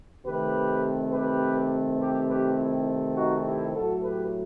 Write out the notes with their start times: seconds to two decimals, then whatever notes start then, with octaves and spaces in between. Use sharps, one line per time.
0.25 C3 D#3 A3 C4 G4 B4
1.13 G4 B4
2.00 G4 B4
2.29 G4 B4
2.58 E4 G4
3.16 D#4 F#4
3.46 E4 G4
3.74 A2 F#3 A3 F#4 A4
4.03 G4 B4